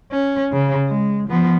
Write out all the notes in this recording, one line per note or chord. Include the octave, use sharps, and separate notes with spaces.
C#4
C#3
G#3
F3 B3